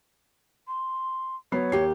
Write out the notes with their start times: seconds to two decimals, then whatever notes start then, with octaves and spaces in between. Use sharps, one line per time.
0.67 C6
1.52 F#3 B3 C#5 C7
1.72 D#2 G4 C7